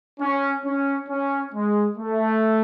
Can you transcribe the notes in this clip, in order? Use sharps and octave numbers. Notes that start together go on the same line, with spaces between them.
C#4
C#4
C#4
G#3
A3